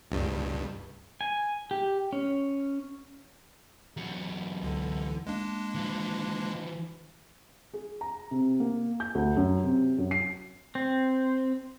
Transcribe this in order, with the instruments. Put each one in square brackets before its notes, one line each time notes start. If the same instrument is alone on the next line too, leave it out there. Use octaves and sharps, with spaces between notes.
[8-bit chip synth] C#2 G2
[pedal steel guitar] G#5
G4
C#4
[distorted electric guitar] E2 F#3
[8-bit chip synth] C#2 D3
G#3 A#3 D4
[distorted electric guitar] E3 F3
[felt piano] G#4
A#5
C3
A#3
G6
D2
F#2
C3
F#2
C7
[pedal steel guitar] C4